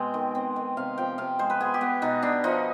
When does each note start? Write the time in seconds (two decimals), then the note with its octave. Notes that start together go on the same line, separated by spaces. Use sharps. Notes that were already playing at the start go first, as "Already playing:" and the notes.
Already playing: B2 G#3 C4 G5
0.14 D#3
0.35 C4
0.56 D#3
0.77 C3 F5
0.98 F3 G5
1.18 C3 F5
1.39 G#3 C5
1.50 B4
1.60 B3 G#4
1.74 G4
1.81 B3
2.02 B2 D#4
2.22 B2 D4
2.44 F3 D#4